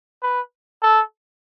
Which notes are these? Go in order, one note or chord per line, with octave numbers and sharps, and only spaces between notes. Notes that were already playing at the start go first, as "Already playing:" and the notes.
B4
A4